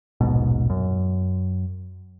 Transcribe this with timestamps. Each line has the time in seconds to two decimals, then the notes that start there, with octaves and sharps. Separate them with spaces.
0.21 D#1 A#1 G#2 B2
0.70 F#2